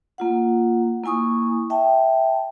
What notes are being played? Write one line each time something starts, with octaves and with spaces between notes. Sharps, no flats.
A#3 F4 F#5
A#3 E4 G#5 C#6 D#6
E5 G5 A5